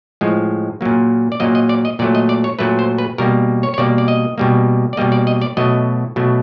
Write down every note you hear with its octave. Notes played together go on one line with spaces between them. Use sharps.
A2 F3 G#3
A#2 F#3 A#3
D5
A#2 F#3 A#3 D#5
D#5
D5
D#5
A#2 F#3 A3 D5
D#5
D5
C#5
A#2 F#3 A3 B4
C5
B4
B2 G3 A#3 A#4
C#5
C#5
B2 G3 A#3 D5
D5
D#5
B2 G3 A#3
D5
B2 G3 A#3 D#5
D5
D#5
D5
B2 F#3 A3 D#5
B2 F#3 A3